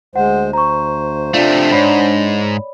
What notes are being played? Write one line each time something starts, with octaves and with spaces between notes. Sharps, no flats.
D2 G#3 C5 F#5
C5 A#5 C#6
C3 A3 D4 F4 D5 F5
G#2 C#5 D5 B5